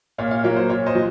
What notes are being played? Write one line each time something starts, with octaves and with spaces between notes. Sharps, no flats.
A#2 C#5 F5
C#5 F5
F#3 A#3 C#5
C5
A#2 C#5
C5 D#5
F#3